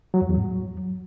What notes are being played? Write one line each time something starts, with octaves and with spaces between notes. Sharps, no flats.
F#3
F2
E2
G#2
F#3